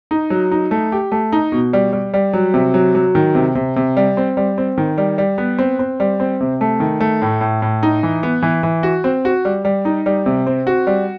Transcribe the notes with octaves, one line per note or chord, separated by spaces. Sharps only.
D#4
F#3
D#4
A3
G4
A3
D#4
B2
G3
G3
G3
F#3
C3
F#3
F#3
D#3
C3
C3
C3
G3
C4
G3
C4
D#3
G3
G3
B3
C4
C4
G3
C4
C3
A3
D#3
A3
A2
A2
A2
D#4
E3
B3
E3
E3
F#4
C4
F#4
G3
G3
D#4
G3
C3
C4
F#4
G3